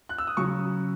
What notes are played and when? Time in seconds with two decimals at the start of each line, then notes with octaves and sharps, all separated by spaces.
0.09 F#6
0.18 E6
0.27 D#6
0.37 C#3 F#3 C#4 C#6